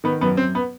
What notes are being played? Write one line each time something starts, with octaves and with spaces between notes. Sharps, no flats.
D#3 B3
F#2 B3
F#2 C4
B3